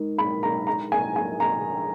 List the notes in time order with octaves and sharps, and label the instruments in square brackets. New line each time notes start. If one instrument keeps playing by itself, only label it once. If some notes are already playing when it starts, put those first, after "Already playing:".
Already playing: [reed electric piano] G#3 D#4 A#4
[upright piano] B5
A#5
A#5
G#5
G#5
A#5